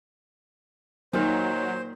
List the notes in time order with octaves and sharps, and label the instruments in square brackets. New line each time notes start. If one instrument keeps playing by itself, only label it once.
[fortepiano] A#2 D#3 F6 [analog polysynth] F#3 [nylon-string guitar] D#4 [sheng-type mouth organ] C5